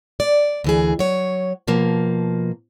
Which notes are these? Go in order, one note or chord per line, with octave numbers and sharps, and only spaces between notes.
D5
D2 E3 G#4
F#3 C#5
B2 F3 A#3